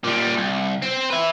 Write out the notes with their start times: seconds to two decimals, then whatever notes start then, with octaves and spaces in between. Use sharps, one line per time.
0.04 A#2 G3
0.37 C2
0.82 C4 C5
1.10 B4 E5